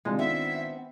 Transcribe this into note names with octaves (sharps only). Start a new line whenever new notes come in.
C3 D#3 G#3 D4 F4
B3 C4 C5 E5